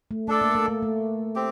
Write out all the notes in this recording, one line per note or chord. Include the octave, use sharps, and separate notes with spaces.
A3
A3 D4 A4 D5
A#3
A3
A3
A3
C4 G4